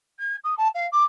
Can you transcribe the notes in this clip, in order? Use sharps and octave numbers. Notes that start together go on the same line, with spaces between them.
G#6
D#6
A5
F5
D6